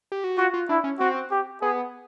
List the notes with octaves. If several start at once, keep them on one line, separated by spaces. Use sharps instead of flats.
G4
F#4
F4 F#4
F4
D4 E4
C#4
C4 F#4
G4
B3 G#4